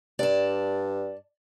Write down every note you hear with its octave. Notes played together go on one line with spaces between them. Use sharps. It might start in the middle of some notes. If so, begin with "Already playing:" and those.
G2 D5 A5